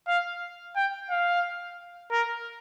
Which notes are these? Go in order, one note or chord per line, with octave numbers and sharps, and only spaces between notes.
F5
G5
F5
A#4